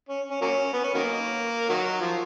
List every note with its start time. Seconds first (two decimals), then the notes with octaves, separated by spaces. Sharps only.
0.09 C#4
0.31 C#4
0.41 F#3 A#3 C#4
0.73 B3
0.84 C#4
0.94 D#3 F#3 A#3
1.69 D#3 F#3
2.01 F3